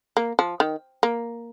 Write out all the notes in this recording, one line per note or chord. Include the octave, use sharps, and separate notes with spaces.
A#3
F3
D#3
A#3